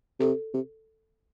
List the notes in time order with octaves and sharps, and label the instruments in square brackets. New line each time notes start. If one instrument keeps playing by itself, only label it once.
[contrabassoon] C3 [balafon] A4
[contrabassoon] C3